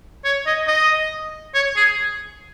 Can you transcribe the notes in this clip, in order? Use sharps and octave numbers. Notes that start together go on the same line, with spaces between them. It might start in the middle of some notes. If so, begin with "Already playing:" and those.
C#5
D#5
D#5
C#5
G#4